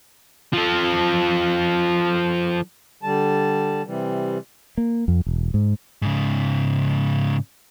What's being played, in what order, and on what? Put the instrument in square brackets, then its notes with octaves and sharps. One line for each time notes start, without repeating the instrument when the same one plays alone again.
[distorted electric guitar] F3 A4
[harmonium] D3 G3 A5
C3 E3 G3
[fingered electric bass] A#3
F2
E1
G#2
[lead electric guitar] G#2 C#3